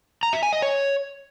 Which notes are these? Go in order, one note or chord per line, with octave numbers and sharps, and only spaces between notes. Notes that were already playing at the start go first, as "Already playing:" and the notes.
A#5
E5
G#5
D#5
C#5